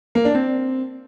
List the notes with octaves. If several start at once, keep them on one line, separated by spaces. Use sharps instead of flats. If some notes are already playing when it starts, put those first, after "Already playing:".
A#3
D4
C4